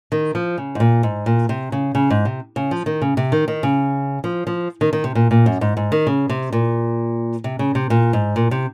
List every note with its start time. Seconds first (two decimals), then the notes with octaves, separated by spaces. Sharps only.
0.12 D#3
0.35 F3
0.58 C#3
0.75 G#2
0.80 A#2
1.03 G#2
1.26 A#2
1.49 C3
1.72 C#3
1.95 C#3
2.10 G#2
2.25 C3
2.56 C#3
2.71 F3
2.86 D#3
3.02 C#3
3.17 C3
3.32 D#3
3.48 D#3
3.63 C#3
4.24 F3
4.47 F3
4.81 D#3
4.93 D#3
5.04 C3
5.15 A#2
5.31 A#2
5.46 F#2
5.61 G#2
5.77 G#2
5.92 D#3
6.07 C#3
6.29 C3
6.53 A#2
7.44 C3
7.59 C#3
7.75 C3
7.90 A#2
8.13 G#2
8.36 A#2
8.51 C3